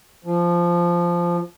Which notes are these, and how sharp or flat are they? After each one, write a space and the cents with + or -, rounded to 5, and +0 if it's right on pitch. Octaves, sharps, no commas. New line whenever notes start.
F3 -10